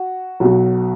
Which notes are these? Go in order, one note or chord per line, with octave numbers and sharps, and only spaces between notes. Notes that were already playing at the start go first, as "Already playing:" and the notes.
Already playing: F#4
B1 B2 F#3